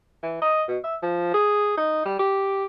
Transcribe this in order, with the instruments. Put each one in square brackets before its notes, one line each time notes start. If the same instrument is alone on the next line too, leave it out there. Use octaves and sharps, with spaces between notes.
[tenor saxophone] E3
D#5
B2
E5
F3
G#4
D#4
G3
G4